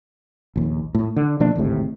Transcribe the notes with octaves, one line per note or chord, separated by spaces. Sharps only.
A#1 D#2
A2
D3
B2 F3 A#3 D4
G#1 D2 A2 C3